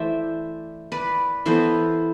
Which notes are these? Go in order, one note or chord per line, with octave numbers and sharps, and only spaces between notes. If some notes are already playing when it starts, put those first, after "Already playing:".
Already playing: E3 A3 C5 D5 E5
B4 D5
E3 B3 A4 C5